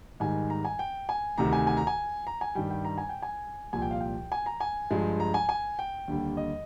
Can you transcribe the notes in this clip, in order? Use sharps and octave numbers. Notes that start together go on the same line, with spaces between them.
G#2 D#3 G3 G#5
A#5
G#5
G5
G#5
D2 C3 D#3 A#5
G#5
G#5
A#5
G#5
A#5
G#5
G2 D#3 G3 G5
G5
A#5
G#5
G5
G#5
C2 A#2 F3 G#5
G5
F5
G5
G#5
A#5
G#5
G2 F3 G#3
A#5
G#5
G#5
G5
D#2 D3 G3
D#5